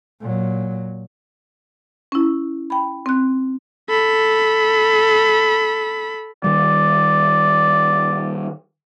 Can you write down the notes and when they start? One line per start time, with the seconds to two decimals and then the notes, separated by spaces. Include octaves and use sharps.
0.21 A#2 F#3
2.12 C#4 E4
2.70 G5 B5
3.06 C4 F#6
3.89 A4 B5
6.44 D#3 G3 D5